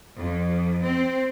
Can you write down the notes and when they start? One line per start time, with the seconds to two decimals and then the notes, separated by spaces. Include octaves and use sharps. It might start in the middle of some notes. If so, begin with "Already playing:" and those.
0.18 F2
0.85 C4